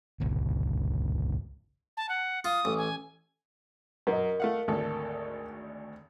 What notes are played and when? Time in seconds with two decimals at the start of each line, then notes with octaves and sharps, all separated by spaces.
0.20 G1 C#2
1.97 A5
2.09 F#5
2.44 F4 D#6
2.65 A1
2.78 G#5
4.07 F#2 A#4 D#5
4.40 A3 F5 F#5
4.68 G#1 D2 A4